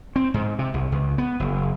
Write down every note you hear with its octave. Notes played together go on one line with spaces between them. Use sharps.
C4
G#2
C3
C2
C#2
B3
F#1